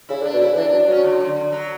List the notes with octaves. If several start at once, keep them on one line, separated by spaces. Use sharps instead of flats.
C#3 E4
D3
D4
B2
C#3 E4
E3 D4
D4
F#3
D4
F#3 C#4
D3
D3
D3
F#3